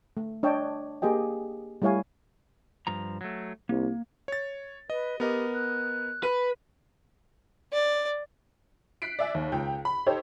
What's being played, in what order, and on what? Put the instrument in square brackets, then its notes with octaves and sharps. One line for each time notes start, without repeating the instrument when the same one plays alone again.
[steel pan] A3
D4 C#5 D#5 G5 A5
A#3 G4 G#4 D#5 G5
G3 A3 E4 C#5 F5 G#5
[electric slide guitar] G2 F3 A#5
F#3 A3
[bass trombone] C2 [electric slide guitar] A#3
[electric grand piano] C#5 A6
[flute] B4 [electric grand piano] D#5
[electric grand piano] B3 A#4 D#5 [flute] G4
[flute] F#6
[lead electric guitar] B4 [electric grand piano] D#7
[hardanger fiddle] D5
[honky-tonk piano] F#6 B6 C7 D7
D5 E5 G#5
D#2
C#2 G5
B5
D#4 G4 A4 C5 C#5